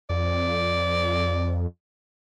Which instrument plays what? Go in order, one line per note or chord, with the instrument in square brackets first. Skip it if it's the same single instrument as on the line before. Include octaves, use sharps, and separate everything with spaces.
[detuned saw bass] F2 [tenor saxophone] D5